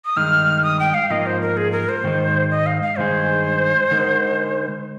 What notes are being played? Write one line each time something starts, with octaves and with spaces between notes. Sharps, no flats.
D#6
G2 D#3 G#3 D#4 F6
D#6
G5
F5
G#2 F3 A#3 D#4 D#5
C5
A#4
G#4
A#4
C5
G#2 D#3 G#3 D#4
D#5
F5
F5
G2 D#3 G#3 D#4 G#4 C5
D3 G#3 D#4 A#4